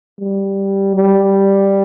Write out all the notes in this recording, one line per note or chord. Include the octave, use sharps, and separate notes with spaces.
G3
G3